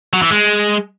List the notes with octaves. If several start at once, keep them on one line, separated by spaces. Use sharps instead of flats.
F#3
E3
G#3